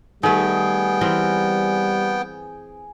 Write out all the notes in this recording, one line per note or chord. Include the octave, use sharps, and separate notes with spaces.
D#3 G3 A3 B3 G#4 G5
E3 C4 A#4